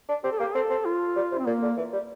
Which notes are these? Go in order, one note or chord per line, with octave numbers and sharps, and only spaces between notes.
D4
C4 G4
A4
A#3 G4
C4 A4
C4
F4
G3
C3
C4
A#2 A#3
D3
E3
G3